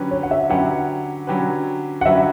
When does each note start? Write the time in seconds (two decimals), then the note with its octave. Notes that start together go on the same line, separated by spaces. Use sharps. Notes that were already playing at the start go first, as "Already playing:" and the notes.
Already playing: D3 F#3 C#4 G4 B4
0.11 C#5
0.23 F#5
0.31 E5
0.49 D3 F#3 C#4 G4 B4 F#5
1.27 D3 F#3 C#4 G4 B4
2.01 F#5
2.05 D3 F#3 C#4 G4 B4 E5